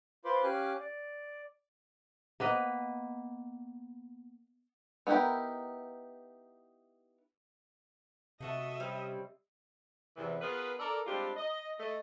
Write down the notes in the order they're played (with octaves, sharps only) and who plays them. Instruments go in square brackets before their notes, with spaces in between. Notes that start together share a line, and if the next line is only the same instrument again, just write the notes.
[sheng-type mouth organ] F4 B4 C5 B5 C6 D6
C#4 G4 F5 G#5 D6 F#6
D5
[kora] A#3 B3 B4 D#5
[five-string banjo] B3 D#4 E4 G4 A#4
[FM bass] C3 [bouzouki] A3 F#4 A5 [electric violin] D#5 E5
[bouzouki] G3 C4 C#4
[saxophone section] E2 C3 E3
B3 F4 G#4 A#4 B4
A4 A#4 D5
G3 G#3 C4 D4 F4 G4
D#5
A3 D#5